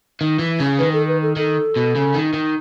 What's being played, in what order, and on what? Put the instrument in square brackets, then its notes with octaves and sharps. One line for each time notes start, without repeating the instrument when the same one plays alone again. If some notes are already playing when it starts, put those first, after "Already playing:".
[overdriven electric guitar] D#3
E3
C#3
[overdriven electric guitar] D#3 [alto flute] B4
[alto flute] A4
B4
A4
[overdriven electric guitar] D#3 [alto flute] A4
[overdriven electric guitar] B2
C#3
D#3
D#3